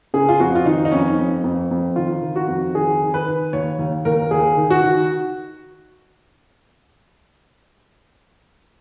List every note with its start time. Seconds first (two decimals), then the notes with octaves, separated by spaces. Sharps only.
0.14 C#3 G#4
0.29 F4
0.40 F2 F#4
0.55 F4
0.65 D#3 D#4
0.85 D#4
0.92 F2 C#4
1.19 F2
1.44 F2
1.71 F2
1.96 D#3 F4
2.22 D#3
2.36 F#4
2.48 F2
2.75 D#3 G#4
3.01 D#3
3.14 B4
3.28 D#3
3.53 D#2 C#5
3.79 D#2
4.05 D#2 A#4
4.31 D#2 G#4
4.57 D#3
4.70 F#4
4.84 D#3